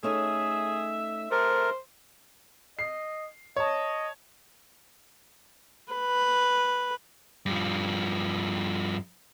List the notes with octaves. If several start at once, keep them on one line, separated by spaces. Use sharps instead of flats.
A3 C#4 D#4 G#4 E5
C3 A3 A#4 C5
D#5 C7
C#5 D#5 A5
B4
G2 F3